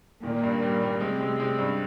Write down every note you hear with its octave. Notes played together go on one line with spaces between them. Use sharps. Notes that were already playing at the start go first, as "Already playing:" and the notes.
A#2 D#3 A#3
G2
G3
G3
C3 G#3 C4
G#3
G#3
G2